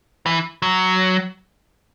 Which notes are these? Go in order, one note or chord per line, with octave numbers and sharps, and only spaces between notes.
E3
F#3